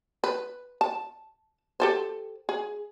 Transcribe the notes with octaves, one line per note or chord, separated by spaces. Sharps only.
B4
A5
G4 A4 C5
G#4